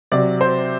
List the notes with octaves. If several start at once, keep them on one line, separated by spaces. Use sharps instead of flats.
C3 F#3 D5
C5